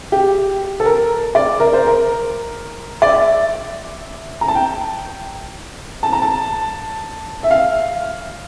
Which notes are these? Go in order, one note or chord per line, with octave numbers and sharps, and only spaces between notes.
G4
A4
A#4
D5
A#4
C5
A#4
D5
E5
A#5
A5
G5
A5
A#5
A5
E5
F5